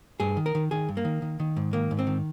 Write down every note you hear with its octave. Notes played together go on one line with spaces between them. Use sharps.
G2 G#4
D#3
A#4
D#3
D#3 G#4
G2
A#3
D#3
D#3
D#3
G#2
D#3 A#3
G#2
C4
D#3